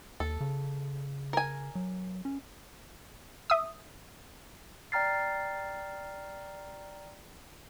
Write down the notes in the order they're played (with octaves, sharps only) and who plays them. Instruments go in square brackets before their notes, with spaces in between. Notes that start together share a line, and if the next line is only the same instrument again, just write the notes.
[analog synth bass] D#2 [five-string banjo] A4
[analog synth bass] C#3
[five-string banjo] A#4 G#5
[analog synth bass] F#3
C#4
[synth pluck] E5 D#6
[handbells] D5 G5 A#5 F6 A6 C7